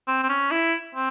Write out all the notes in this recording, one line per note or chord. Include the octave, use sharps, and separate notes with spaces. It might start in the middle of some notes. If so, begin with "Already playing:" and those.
C4
C4
C#4
E4
C4